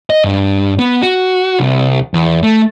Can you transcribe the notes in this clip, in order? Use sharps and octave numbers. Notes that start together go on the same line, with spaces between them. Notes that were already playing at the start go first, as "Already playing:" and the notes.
D#5
G2
B3
F#4
C2
E2
A3